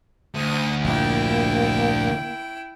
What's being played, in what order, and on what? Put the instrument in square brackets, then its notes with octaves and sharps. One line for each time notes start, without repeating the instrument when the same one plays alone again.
[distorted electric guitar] D2 [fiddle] D#6
[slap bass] A#1 G2 A#2 [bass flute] A#3 [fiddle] E4 G5